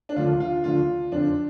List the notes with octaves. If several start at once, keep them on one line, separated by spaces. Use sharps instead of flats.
D4
D2 D3 F3 F4
F4
D2 D3 F3 F4
F2 D3 F3 C4 D4